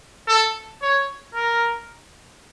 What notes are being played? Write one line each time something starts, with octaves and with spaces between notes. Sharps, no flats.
A4
C#5
A#4